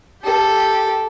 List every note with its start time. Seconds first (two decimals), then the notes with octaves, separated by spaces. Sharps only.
0.23 G4 A4